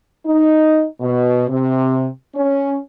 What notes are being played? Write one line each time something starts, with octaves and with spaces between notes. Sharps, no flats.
D#4
B2
C3
C#4